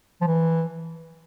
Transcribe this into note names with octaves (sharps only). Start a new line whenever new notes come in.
F3
E3